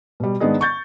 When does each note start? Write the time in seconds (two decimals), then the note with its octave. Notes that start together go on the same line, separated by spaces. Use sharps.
0.20 B2 G3
0.40 G#2 D#3 B3 D4 G#4 D#5
0.61 C#6 G6 A6